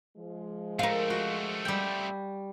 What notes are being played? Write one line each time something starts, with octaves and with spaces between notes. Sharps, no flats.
F3 G#3
A3 C4 A#4 F5
F#4
G3 G5